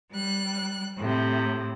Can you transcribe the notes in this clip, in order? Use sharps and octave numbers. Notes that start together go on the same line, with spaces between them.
G3 F#6
A2 C3